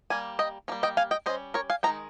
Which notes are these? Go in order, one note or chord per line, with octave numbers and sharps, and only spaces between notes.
G3 A#3 G#5
D#5 G5
G3 A#3 C#4
D#5 G5
F5 G#5
D#5 G5
G3 C#4 C5 D#5
A#4 C#5
F5 G#5
D#3 G#3 C4 D#4 G5 A#5